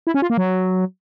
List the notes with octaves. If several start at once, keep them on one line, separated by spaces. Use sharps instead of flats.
E4
C#4
F4
A#3
F#3